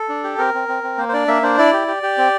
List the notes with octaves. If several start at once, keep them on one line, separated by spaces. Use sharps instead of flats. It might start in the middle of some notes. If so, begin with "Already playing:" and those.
Already playing: A4
D4
G4
C4 A#4
C4
C4
C4
A#3 C5
C5
D4 D5
A#3 E5
D4 C5
E4 D5
G4
G4
G4
C4